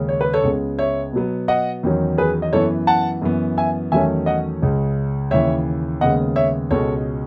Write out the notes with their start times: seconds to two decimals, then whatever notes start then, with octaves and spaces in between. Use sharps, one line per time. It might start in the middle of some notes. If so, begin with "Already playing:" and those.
Already playing: D#2 C#3 G#3 C#4
0.09 C#5
0.21 B4
0.33 A4 C#5
0.43 C#2 C#3 G#3 B3
0.79 C#5 E5
1.13 B2 F#3 B3
1.48 D#5 F#5
1.83 E2 D#3 F#3 C#4
2.18 G#4 B4
2.42 D#5
2.53 F#2 E3 B3 A4 C#5
2.87 F#5 A5
3.22 F#2 E3 B3
3.58 E5 G#5
3.92 E2 D#3 F#3 A3 C#4 E5 G#5
4.26 D#5 F#5
4.62 C#2 C#3 G#3
5.31 D#2 C#3 E3 C#5 E5
6.01 D#2 C#3 G#3 B3 D#5 F#5
6.36 C#5 E5
6.71 C#2 B2 G#3 C#4 A4 C#5